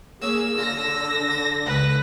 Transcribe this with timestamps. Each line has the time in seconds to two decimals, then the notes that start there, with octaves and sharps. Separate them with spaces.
0.22 A#3 C#4 G#4 E6
0.57 D3 F4 A#6
1.31 A4
1.66 C#2 B4